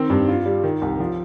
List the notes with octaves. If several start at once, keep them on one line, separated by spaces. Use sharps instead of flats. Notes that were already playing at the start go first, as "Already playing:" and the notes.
Already playing: D#3 C4
G2
F4
G3
D#3
C2
F3